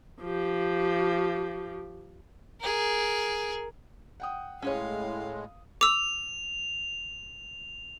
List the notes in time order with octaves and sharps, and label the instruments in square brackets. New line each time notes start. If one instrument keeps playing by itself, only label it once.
[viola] F3 G4
[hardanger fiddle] G#4 A#4
[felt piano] F#5 G5 D#6
[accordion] A2 G#3 [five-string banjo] C#4 G#4 C#5 [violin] F5
[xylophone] D6 E6 [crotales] F7